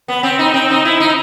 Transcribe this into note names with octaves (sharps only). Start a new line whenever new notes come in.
B3
C4
D#4
C4
D#4
E4
D#4